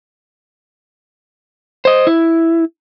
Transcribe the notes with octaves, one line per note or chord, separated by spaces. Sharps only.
C5 D#5
E4